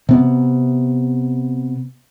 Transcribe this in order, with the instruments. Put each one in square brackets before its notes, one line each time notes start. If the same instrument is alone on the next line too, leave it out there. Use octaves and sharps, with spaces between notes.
[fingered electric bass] C3 B3